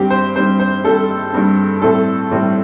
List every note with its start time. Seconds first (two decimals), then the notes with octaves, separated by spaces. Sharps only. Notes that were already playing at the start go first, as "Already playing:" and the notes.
Already playing: G2 G3 C4 G4
0.10 C5
0.36 G2 G3 C4 C5
0.60 C5
0.85 G2 G3 C4 A4
1.33 G2 G3 C4
1.82 A2 G3 C4 A4
2.31 A2 G3 C4